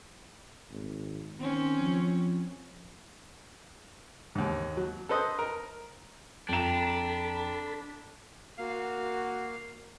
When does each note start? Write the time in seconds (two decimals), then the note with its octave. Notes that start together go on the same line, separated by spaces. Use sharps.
0.71 G#1
1.39 D#3 C4 C#4
1.80 F3
4.35 D#2 G#2
4.77 F#3
5.09 A4 B4 C5 D#5
5.39 A#4
6.49 F2 D4 A4 G5 A#5 B5 E7
8.58 A#3 F#4 F5